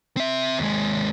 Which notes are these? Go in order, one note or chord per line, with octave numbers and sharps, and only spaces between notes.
C4 E5
D#2 G#3